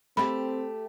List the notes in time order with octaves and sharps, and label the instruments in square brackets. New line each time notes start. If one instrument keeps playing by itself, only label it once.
[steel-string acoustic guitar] A3 G4 [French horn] C4 [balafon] B5